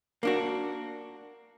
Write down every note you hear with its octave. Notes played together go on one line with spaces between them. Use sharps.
A#3 D4 F#4